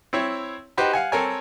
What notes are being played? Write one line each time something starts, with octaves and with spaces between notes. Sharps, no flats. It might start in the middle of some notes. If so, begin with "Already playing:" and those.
C4 E4 C#5
D#4 F#4 G4 B4 C5
F5 F#5 G#5
C4 A4 A#4 C#5 G#5